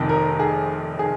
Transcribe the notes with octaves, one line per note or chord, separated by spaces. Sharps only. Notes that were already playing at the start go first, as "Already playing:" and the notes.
Already playing: F1 F2 C3 D#3
A#4
G#4
G#4